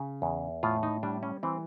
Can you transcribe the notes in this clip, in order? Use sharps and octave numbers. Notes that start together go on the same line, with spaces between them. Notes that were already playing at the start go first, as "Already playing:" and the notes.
Already playing: C#3
E2
A2 F4
D#4
G3 D4
C#4
E3 C4